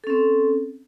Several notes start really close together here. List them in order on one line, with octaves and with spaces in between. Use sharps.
A4 C#4 C4